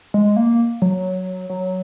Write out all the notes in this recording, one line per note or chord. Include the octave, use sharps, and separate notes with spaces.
G#3
A#3
F#3
F#3